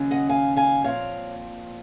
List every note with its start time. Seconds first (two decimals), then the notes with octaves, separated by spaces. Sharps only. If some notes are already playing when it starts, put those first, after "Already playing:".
Already playing: D#2 C#3 F#3 C#4
0.11 D#5 F#5
0.29 F5 G#5
0.56 F5 G#5
0.84 A#2 F3 C4 C#5 F5